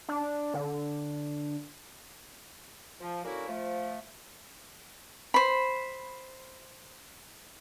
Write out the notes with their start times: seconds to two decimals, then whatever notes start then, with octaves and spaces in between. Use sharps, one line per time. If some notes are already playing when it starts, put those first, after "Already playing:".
0.09 D4
0.54 D3
3.00 F3
3.24 D3 A#3 C#4 E4 F#4
3.48 F3 A3
5.34 C5 B5